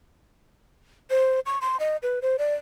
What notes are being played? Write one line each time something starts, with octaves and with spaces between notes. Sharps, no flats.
C5
C#6
C6
D#5
B4
C5
D5